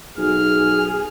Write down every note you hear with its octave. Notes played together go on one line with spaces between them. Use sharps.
B1 G#4 F6